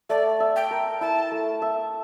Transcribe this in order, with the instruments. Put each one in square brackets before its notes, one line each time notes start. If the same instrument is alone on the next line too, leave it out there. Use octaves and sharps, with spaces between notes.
[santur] A3 [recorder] D5
[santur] E5
[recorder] G5
[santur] A#4
[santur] E4 [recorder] A5
[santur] A3
E5